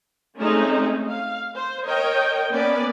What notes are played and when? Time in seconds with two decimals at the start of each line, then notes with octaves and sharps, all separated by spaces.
0.38 G#3 A3 C4 C#4 D#4 G#4
1.09 F5
1.57 C5
1.86 A#4 C#5 D#5 G5
2.52 A#3 B3 C#4 B4 D5